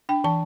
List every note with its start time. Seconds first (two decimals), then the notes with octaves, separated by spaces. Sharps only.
0.09 D4 G5
0.24 E3 A5